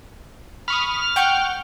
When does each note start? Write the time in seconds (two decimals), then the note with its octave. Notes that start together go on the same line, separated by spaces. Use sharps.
0.68 B5 C#6 D#6 F6
1.16 F#5 G5 C#6 G6